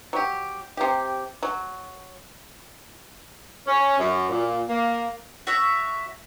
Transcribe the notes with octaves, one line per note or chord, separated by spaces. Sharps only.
F#3 G4
C3 G4
F#3
C#4
F#2
A#2
A#3
F#4 C#5 E5